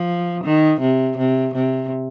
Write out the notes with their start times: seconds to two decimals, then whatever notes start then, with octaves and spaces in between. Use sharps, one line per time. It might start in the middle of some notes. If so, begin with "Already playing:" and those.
Already playing: F3
0.44 D#3
0.81 C3
1.17 C3
1.55 C3